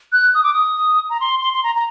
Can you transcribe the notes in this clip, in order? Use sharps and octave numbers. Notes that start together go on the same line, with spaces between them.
F#6
D#6
D6
D#6
A#5
C6
C6
C6
A#5
A#5